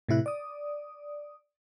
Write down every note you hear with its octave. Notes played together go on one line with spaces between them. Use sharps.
A2 C3 E4 F#6
D5 D#6